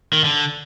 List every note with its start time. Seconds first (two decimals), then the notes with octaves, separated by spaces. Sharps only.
0.13 D#3
0.24 D3